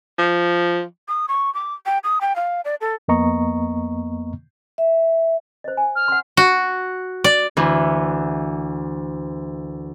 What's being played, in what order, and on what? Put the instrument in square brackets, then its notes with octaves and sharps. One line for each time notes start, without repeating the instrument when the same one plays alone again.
[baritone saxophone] F3
[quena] D#6
C#6
D6
G5
D#6
G5
F5
D5
A4
[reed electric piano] F2 A#3 B3 D#5 A#5 C#6
[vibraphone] E5
[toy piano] C5 D#5
G#5
[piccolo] F6
[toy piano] F#5 C6
[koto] F#4
D5
[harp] D2 E3